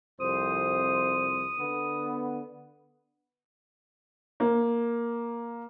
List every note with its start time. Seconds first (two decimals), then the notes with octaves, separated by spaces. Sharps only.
0.20 C2 F2 C5 D#6
1.58 D3 B3
4.40 A#3